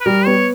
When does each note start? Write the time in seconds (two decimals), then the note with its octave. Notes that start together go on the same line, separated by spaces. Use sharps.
0.01 B4
0.06 G3 A#4
0.26 B3 C#5